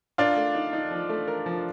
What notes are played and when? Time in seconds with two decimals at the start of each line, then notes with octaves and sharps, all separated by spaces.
0.18 D4 F4 A#4
0.36 A3
0.54 D#4
0.73 D#4
0.91 F3
1.09 A3
1.28 A#4
1.46 F3